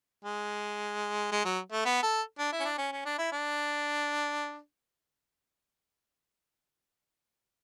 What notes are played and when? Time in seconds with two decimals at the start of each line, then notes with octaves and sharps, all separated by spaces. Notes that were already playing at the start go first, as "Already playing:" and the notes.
0.25 G#3
1.32 G#3
1.45 F#3
1.72 A3
1.85 B3
2.03 A4
2.39 D4
2.52 E4
2.60 C#4
2.65 D4
2.78 C#4
2.92 C#4
3.05 D4
3.19 E4
3.32 D4